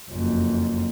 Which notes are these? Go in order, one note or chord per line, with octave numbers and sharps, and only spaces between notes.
F#1 F2